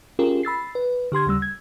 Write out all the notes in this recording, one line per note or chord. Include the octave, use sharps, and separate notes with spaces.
C#4 F4 G4 G#4 A#4
B5 E6 A6 C7
B4
D3 G4 C6 G#6
D#2 C#3 G3 E6
G#6